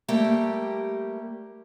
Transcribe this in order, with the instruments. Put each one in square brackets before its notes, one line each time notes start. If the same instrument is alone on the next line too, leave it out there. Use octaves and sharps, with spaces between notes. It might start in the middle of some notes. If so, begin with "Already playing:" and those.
[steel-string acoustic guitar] G3 A3 A#3 G4